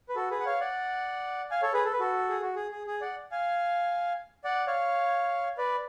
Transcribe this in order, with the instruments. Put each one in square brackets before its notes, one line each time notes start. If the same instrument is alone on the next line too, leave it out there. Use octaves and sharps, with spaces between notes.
[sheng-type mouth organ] B4
F#4 A4
G#4 B4
F#5
C#5 F5
D5 F#5
F5 G#5
A4 C#5
G#4 B4
A4
B4
F#4 A4
G#4
F#4
G#4
G#4
G#4
D5 F#5
F5 G#5
D5 F#5
C#5 F5
B4 D5